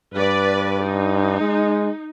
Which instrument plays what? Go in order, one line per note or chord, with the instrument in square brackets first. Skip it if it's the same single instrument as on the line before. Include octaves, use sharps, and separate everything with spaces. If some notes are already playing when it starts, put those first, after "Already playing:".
[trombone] G2 [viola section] B4 D5
[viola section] D#4
[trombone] G#3